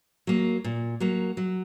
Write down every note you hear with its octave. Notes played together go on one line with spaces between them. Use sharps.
F#3 A#3
A#2
F#3 A#3
F#3